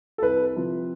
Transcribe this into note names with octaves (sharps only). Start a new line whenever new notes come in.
A4
C2 B4
C3 F3